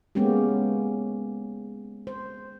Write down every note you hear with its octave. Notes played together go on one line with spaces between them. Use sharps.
G#3 A#3 B3 C#4 G4
C5